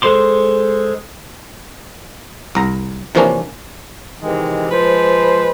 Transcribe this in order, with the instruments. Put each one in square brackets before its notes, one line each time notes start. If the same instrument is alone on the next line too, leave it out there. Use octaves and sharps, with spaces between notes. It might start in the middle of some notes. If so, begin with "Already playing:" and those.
[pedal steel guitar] G#3 A4 C5 C6 D6
[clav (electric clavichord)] C2 A#5
C3 E3 F3 A#3 C#4 D4
[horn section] C3 D#3 E3 G#3
F3 G#3 B4 C5